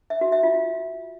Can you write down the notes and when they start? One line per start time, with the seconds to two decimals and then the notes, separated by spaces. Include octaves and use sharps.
0.10 E5
0.21 F#4
0.32 E5
0.43 F4